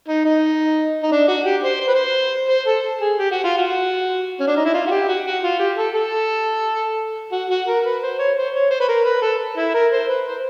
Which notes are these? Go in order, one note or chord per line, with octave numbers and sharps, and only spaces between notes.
D#4
D#4
D#4
D4
F#4
G4
C5
C5
B4
C5
C5
A4
G#4
G4
F#4
F4
F#4
C#4
D4
D#4
E4
F4
F#4
G4
F#4
F#4
F4
G4
A4
A4
F#4
F#4
A#4
B4
C5
C#5
C5
C#5
C5
B4
A#4
B4
A4
E4
A#4
C5
B4
C5